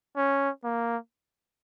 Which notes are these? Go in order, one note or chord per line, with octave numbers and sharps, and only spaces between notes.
C#4
A#3